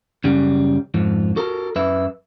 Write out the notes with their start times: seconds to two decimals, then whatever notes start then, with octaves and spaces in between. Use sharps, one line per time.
0.24 F#2 C#3 G3
0.94 F2 G#2 F3
1.36 F#4 A4 A#4
1.76 F#2 B4 E5